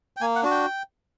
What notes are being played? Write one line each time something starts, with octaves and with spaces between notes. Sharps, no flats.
G5
A#3 G#5
F#5
D4 F#4
G5